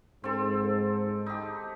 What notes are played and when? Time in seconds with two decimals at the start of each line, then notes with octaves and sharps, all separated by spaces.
0.24 G#2 C4 A4
1.26 D#4 G4